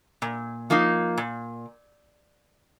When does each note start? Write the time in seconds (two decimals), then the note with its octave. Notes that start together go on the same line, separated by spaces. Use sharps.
0.22 A#2
0.70 F3 A#3 D#4
1.17 A#2